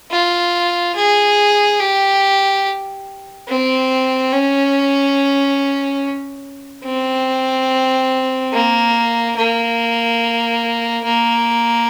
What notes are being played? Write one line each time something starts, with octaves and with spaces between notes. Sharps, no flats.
F4
G#4
G4
C4
C#4
C4
A#3
A#3
A#3